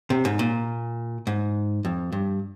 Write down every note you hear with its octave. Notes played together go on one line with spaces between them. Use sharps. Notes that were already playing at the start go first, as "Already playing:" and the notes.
C3
G#2
A#2
G#2
F2
G2